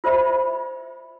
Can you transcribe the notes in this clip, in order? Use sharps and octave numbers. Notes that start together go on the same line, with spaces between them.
F4 C5 D5 E5 B5